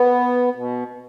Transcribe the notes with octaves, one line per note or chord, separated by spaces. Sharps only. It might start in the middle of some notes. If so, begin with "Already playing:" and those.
Already playing: B3
B2